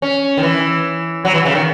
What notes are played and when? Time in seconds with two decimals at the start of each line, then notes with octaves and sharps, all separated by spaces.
0.02 C#4
0.38 D#3
0.43 E3
1.25 F#3
1.34 E3
1.45 C#3
1.55 D#3